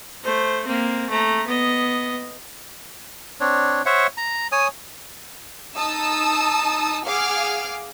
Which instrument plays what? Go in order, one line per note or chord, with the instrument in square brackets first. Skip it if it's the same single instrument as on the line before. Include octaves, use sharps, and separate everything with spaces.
[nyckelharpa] A3 C5
A#3 C4
A3 A#5
B3 D#5
[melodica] C4 D4 C#5
C5 C#5 E5 F#5
A#5
C#5 G#5 D#6
[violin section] D#4 A5 D#6 E6
G#4 F5 F#5 D6 F6